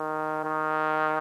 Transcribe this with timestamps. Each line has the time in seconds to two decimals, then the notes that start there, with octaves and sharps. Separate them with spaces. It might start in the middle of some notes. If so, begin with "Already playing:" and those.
Already playing: D#3
0.44 D#3